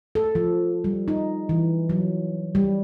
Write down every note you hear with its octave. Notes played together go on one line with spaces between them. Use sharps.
A4
F3
G3
D#4
E3
F#3
G3